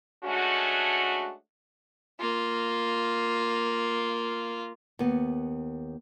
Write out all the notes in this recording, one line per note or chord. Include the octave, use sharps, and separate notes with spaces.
G#3 A3 C#4 D4 F#4
A#3 F4
D#2 B3